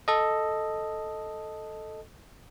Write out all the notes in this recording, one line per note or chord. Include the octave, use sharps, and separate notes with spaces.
A4 D#5